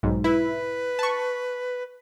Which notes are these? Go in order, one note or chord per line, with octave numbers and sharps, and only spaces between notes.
B1 G#2
E4 B4
A5 C#6